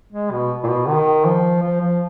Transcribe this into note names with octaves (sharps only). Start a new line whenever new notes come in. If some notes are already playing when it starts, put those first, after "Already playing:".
G#3
B2
A#2
B2
D#3
F3
F3
F3